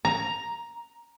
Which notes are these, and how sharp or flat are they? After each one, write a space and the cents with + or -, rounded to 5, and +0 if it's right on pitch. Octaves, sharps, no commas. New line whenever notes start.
A#5 +5